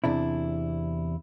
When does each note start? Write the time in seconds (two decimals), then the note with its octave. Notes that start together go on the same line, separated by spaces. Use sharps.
0.04 E2 C3 D4 E4